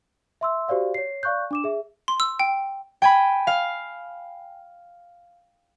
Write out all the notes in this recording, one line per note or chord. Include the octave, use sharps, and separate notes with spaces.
E5 C6 E6
F#4 G4 C5 D5 F5
C#5 C7
D5 F5 C#6 F#6 G6
D4 D6 E7
G#4 E5
C6
E6
G5
G5 G#5 B5
F5